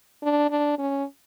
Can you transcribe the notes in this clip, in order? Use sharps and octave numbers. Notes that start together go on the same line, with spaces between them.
D4
D4
C#4